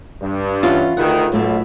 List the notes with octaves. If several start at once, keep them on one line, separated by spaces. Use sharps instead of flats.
G2
E3 C#4 F4 F#5
D2 D#3 G#4 B4 F#5
B1 A2 A3 A#3